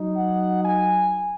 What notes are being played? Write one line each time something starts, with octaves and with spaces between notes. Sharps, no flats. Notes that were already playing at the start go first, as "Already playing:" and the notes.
Already playing: F#3 D#4
F#5
G#5